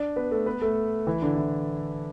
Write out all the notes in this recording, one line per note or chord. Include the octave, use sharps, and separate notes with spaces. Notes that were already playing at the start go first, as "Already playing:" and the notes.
Already playing: D4 D5
B3 B4
A3 A4
B3 B4
A3 A4
E3 E4
D3 D4
E3 E4